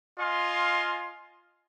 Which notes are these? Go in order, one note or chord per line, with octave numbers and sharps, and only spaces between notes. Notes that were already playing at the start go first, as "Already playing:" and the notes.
F4 D#5 F5 G#5 C6